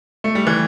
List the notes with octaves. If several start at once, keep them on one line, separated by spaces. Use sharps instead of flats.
A3
G3
E3